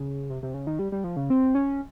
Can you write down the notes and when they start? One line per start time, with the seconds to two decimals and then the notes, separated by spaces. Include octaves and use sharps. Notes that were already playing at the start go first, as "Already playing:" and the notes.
Already playing: C#3
0.30 C3
0.43 C3
0.54 C#3
0.67 D#3
0.79 G3
0.92 G3
1.04 F3
1.16 C#3
1.30 C4
1.55 C#4